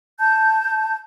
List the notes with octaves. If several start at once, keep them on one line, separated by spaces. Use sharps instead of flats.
A5 G6